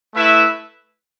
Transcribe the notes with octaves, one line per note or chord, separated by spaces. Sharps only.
A3 E4 B4 E5